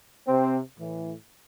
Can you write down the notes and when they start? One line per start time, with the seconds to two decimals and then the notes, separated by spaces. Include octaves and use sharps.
0.27 C3 C4
0.79 A2 E3